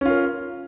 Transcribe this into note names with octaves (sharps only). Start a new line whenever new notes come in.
C#4 F4 A#4